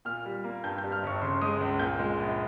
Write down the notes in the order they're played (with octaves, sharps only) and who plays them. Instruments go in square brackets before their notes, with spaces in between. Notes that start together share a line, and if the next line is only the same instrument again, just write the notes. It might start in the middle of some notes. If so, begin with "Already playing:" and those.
[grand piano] A#2 F6
G3
A#3
G2 G6
G6
G3
F6
G1 C#6
C#3 C6
G#3 D#6
C#2
A#2 G6
G#3
A#1